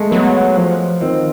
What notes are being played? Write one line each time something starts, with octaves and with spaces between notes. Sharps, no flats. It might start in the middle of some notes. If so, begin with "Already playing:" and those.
Already playing: G#3 A3
F#3 B3
F3
D#3 C4